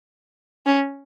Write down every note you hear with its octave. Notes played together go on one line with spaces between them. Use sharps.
C#4